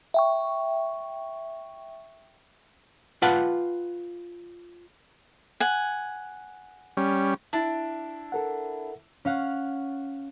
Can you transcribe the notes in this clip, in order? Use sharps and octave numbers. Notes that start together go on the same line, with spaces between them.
E5 G5 C#6
F4 B4 F#5 G5 A5
F#5 G#5
G3 C#4
D4 E4
A4 A#4 F#5
C#4 F5 F#5